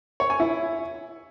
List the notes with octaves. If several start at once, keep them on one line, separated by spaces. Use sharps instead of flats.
C#5
G#5
E4